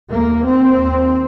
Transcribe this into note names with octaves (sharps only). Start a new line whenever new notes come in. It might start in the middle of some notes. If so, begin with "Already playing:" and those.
D#2 A#3
C4
D#2